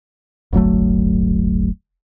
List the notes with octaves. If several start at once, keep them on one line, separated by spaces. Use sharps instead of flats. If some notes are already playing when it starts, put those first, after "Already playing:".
D1 G1 F#3 A3